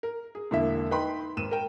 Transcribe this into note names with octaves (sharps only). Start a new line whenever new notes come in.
A#4
G#4
E1 D3 A#3 E4 E5
D#4 B4 G5 B5 C6
G#1 D#7 E7
A#4 G5